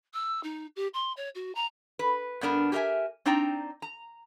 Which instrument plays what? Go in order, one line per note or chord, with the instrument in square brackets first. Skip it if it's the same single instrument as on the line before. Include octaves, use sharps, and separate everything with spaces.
[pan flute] E6
D#4
G4
C6
C#5
F#4
A#5
[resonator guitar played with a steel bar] B4
G2 B3 D4 A#4
G4 G#4 A#4 D#5 E5 G#5
C4 D4 D#4 D5 G5 A#5
A#5